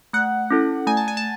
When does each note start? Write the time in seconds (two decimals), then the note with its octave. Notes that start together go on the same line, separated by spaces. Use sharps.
0.13 A3 F#5
0.51 C#4 E4 A4
0.87 A3 G#5
0.97 A5
1.08 G#5
1.17 A5